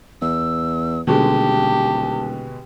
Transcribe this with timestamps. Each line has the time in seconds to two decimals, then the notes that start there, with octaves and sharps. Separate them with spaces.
0.22 E2 E6
1.07 D#1 B2 D3 G#3 G4 A5